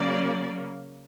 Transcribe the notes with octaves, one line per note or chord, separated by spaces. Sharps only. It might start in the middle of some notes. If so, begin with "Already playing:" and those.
Already playing: C#3 F#3 A#3 D5